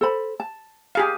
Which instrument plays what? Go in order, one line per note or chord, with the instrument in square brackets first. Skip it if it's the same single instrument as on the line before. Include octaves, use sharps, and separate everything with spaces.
[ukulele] A4 C5 B5
A5
[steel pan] G4 G#4 F5